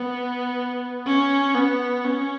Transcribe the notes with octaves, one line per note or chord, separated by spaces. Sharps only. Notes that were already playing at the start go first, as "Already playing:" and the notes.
Already playing: B3
C#4
B3
C#4